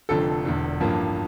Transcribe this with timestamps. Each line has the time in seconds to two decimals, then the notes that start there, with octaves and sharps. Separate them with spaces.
0.09 F1 F2 D3 F3 A4
0.45 E1 E2 D3
0.80 A1 G2 F3 A#3